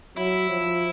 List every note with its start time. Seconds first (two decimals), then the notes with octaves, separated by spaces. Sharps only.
0.16 F#3 E4
0.49 F3